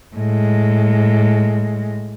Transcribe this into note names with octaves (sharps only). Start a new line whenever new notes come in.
A2 G#3